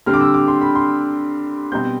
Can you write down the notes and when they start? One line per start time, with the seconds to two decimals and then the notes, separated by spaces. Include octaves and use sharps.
0.06 D3 G3 C4 F6
0.14 D6
0.21 E6
0.34 D6
0.48 C6
0.61 B5
0.75 C6
1.72 B2 G3 C4 G6